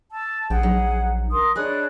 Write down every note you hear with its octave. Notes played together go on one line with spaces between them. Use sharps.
A5 E6
A#1 G#4 F#5 G5
F#3 D#4
A#4 C6 D#6
D4 G#4 B4 C#5 D#5 F#6